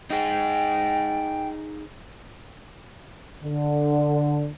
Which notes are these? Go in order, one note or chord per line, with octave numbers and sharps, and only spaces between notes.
D#4 G#4 G5
D3